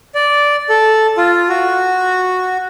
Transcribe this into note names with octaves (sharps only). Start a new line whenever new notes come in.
D5
A4
F4
F#4